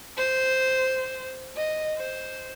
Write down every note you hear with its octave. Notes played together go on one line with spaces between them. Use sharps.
C5
D#5
C5